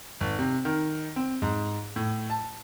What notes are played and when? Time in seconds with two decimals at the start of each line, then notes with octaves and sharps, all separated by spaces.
0.21 G#1
0.39 C3
0.65 D#3
1.16 C4
1.42 G#2
1.96 A2
2.30 A5